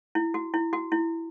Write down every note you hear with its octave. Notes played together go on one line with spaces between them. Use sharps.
E4
F#4
E4
F#4
E4